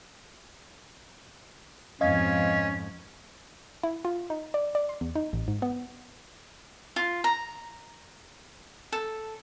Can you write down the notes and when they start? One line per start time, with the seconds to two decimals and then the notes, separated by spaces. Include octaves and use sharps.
2.01 F2 G#2 C#4 D#5 F5 G#6
3.83 E4
4.05 F4
4.30 D#4
4.54 D5
4.75 D5
4.89 C6
5.01 E2
5.15 D#4
5.33 A1
5.48 G#2
5.62 B3
6.96 F4
7.24 A#5
8.92 A4